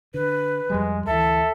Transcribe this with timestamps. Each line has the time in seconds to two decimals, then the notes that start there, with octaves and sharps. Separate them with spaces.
0.14 D3 B4
0.70 F2 F3 G3 G#3
1.07 D2 E3 A4 E5